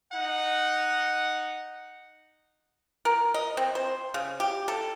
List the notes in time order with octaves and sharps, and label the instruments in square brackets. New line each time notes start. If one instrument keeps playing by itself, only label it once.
[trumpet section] D#4 F#5
[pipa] A#4
D#5
C4
C5
C#3
G4
A4